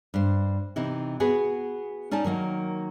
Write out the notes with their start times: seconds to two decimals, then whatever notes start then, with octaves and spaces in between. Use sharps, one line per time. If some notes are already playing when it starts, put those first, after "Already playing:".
0.14 G2 C5
0.76 C3 E3 D#4 E4
1.20 B3 F#4 G#4 B4
2.11 C#4 D#4 D5 G#5 A5
2.24 D#3 F#3 A#3 D#4